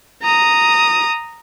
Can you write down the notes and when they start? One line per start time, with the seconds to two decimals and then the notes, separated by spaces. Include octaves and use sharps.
0.23 A#5 D#6